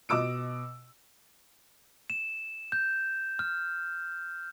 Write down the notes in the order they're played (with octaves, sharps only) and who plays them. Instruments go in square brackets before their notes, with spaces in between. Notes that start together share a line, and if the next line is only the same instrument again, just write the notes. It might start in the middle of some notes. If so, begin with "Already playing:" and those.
[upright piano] B2 D#5 D6 E6 D7
[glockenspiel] E7
G6
F6